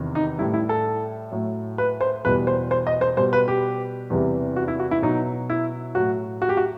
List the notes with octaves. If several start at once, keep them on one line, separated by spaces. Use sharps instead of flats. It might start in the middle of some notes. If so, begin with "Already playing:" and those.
Already playing: E2 C3 D#3
D#4
A2 G3 E4
E4
A4
A2 F#3
B4
C5
E2 B2 G3 B4
C5
C5
D#5
C5
B2 G3 C5
B4
G4
E2 C3 E3 G3
F#4
E4
F#4
E4
B2 F#3 D#4
E4
A2 F#3 F#4
F#4
G4
F#4